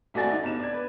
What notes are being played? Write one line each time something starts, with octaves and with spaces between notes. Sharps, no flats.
G#1 A3 F#4 D5 G#5 A6
D#4
G1 E7
D5 G#6
B4